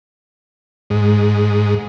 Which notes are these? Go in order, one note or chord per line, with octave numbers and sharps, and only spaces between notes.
G#2